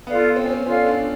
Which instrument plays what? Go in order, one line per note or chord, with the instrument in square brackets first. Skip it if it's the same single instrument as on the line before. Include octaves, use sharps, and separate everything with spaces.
[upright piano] B3 [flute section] F4 A4 D5 F5
[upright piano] C4
C#4
C4
[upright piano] C#4 [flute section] F4 A4 D5 F5
[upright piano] D4